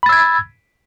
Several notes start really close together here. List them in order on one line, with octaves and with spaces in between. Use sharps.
B5 A6 E6 G#6